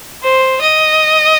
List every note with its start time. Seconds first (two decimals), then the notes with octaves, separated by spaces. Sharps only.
0.23 C5
0.61 D#5